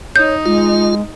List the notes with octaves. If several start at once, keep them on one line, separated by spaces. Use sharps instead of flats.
D#4 C#5 G6
G#3 F4